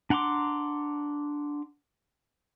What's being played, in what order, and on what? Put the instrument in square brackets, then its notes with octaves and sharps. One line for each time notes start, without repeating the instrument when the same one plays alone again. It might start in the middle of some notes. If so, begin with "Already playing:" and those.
[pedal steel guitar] D4 F#5 A#5 C6 D6